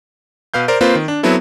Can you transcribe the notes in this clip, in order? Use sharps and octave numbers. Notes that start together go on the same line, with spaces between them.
B2 B4 F5 G6
A#4 C5 D5
A#3 C4 F4 B4 C5
D#3
D4
F#3 B3 C4 E4 A4